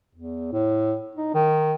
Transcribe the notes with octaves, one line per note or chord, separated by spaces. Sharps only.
E2
A2
D#4
D#3